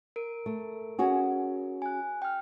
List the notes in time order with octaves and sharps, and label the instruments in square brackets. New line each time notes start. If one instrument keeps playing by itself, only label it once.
[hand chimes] A#4 D7
[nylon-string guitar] A3
C#4 F#4 G#4
[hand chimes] G#5 F#6
G5 F6